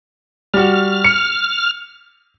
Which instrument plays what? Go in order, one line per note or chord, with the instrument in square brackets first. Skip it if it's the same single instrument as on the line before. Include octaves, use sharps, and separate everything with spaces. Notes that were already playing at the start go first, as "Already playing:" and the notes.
[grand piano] G3 F#4 [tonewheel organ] F6
[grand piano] C#7